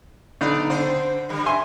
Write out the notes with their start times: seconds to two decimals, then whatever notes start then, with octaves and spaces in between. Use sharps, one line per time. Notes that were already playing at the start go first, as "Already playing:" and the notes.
0.41 B1 D3 D#4 D5
0.70 D3 C4 C5
1.29 D3 G3
1.46 E5 G#5 C6